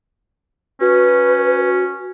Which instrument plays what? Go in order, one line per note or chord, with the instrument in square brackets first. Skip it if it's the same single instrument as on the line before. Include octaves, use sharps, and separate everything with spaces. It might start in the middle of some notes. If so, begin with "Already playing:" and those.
[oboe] C#4 [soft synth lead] F#4 [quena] B4